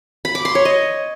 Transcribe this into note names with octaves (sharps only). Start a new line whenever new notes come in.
B5
D6
C6
C#5
D#5